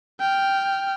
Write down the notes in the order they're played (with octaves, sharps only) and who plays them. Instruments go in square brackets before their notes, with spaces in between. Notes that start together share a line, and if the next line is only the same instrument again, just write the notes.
[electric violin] G5 F6